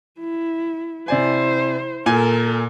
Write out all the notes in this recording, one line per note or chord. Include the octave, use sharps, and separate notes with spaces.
E4
C3 E4 C5 D5 G#5
A#2 A4 A#4 G#5